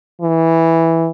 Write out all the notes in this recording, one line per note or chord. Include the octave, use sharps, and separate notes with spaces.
E3